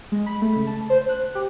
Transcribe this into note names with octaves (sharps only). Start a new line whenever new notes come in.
G#3
B5
A3
C#3
A5
C5
F#6
G4